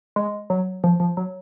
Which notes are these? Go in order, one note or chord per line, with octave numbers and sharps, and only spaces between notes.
G#3
F#3
F3
F3
F#3